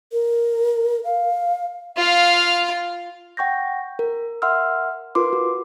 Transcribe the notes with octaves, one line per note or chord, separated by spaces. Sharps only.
A#4
F5
F4 F5
F#5 G5 C#6 G6 A#6
A#4
A#4 E5 F#5 C6 E6 F6
F4 A#4 B4 C6 D6
F#4